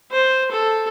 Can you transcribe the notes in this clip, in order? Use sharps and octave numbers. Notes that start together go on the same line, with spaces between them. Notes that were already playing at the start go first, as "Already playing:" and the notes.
C5
A4